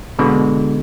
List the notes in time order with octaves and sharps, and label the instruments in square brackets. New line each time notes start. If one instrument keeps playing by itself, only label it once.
[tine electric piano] B2 D3 G#3